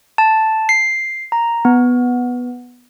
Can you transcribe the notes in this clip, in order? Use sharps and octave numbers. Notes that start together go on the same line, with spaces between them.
A5
C7
A#5
B3